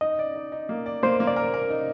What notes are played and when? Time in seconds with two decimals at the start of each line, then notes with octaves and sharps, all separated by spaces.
0.01 D#4 D#5
0.19 D5
0.35 D#4
0.52 D#4
0.69 A#3
0.86 D5
1.03 A#3 C5
1.20 A#3
1.27 D5
1.36 A#4
1.54 A#4
1.70 D#4